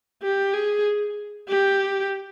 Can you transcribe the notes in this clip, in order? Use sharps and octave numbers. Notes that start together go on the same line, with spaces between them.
G4
G#4
G4